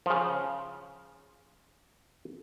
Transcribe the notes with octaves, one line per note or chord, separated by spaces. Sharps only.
C#3 F3